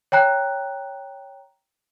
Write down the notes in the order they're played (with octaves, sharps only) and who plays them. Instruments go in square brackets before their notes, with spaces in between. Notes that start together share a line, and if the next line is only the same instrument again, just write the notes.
[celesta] C#5 G5 A#5 F#6